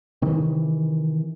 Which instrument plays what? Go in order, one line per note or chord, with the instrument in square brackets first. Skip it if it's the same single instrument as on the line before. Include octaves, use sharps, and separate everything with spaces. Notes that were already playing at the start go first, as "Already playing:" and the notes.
[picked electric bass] C3 D#3 E3